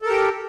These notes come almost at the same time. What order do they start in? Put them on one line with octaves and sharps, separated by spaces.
A4 A#4 G4